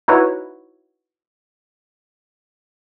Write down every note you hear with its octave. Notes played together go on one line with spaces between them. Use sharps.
D#4 E4 F#4 B4 C#5